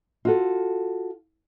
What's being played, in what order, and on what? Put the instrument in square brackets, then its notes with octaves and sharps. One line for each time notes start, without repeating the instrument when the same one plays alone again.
[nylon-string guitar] F4 F#4 A4